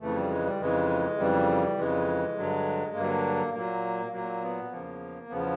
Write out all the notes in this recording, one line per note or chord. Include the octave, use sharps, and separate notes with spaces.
F2 C#3 E3 A3
G3
G#3
G3
F2 C#3 E3 G#3
F2 C#3 E3 G3
F2 C#3 E3 G#3
G2 D3 F#3
G2 D3 F#3 A#3
A#2 F#3 A#3
A#2 F#3 A#3
B3
E2 C#3 F3 A#3
E2 C#3 F3 B3